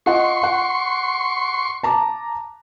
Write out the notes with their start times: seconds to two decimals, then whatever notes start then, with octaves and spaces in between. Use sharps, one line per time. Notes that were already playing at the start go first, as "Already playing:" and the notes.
0.06 F4 D#5 F#5 C6 C#6
0.43 F#5
1.83 A5 A#5 D6